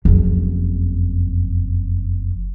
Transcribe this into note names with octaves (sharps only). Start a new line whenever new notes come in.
F#1 F2